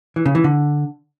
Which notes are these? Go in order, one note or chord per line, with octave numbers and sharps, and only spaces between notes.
E3
C#3
E3
D3